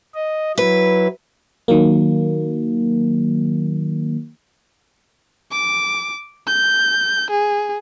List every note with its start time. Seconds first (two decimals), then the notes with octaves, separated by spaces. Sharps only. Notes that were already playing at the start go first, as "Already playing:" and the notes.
0.14 D#5
0.58 F#3 E4 B4
1.68 D#3 F#3 A#3
5.51 D6
6.47 G6
7.30 G#4